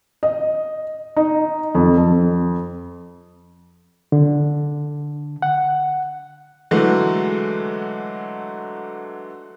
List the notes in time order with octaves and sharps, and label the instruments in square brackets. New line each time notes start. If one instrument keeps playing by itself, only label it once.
[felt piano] D#5
D#4
F2
F2
[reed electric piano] D3
F#5
[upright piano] D3 E3 F#3 G#3 A3